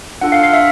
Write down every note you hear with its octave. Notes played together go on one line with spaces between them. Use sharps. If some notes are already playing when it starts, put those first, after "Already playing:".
D4 F4 A4 F#5
F5
F5
D4 E5